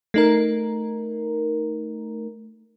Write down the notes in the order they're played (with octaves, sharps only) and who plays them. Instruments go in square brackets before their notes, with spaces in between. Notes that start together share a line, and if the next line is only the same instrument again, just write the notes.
[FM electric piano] A3 D#4 A#4